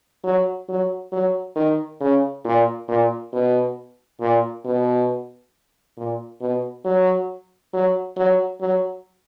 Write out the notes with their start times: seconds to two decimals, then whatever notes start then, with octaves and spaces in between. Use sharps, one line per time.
0.24 F#3
0.69 F#3
1.12 F#3
1.56 D#3
2.01 C#3
2.45 A#2
2.88 A#2
3.33 B2
4.21 A#2
4.65 B2
5.97 A#2
6.41 B2
6.85 F#3
7.73 F#3
8.17 F#3
8.61 F#3